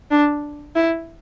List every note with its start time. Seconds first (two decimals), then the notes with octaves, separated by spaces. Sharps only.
0.11 D4
0.76 E4